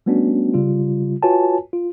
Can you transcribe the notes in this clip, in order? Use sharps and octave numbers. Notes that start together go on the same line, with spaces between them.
G3 A3 B3 C#4 D4 F#4
C#3 G3 F4
F4 F#4 B4 C#5 G#5 A5
F4